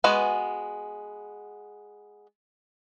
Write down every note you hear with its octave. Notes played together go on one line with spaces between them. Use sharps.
G#3 B3 F#4 B4 G#5